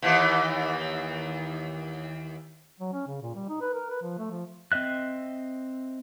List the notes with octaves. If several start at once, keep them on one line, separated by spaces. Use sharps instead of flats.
D#2 E3
F#3
C#4
C#3
A#2
G3
D#4
B4
A#4
B4
F3
A3
F3
C4 D#5 E5 F#6